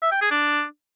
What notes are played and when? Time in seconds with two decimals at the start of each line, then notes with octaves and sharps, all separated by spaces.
0.02 E5
0.12 G5
0.21 G#4
0.31 D4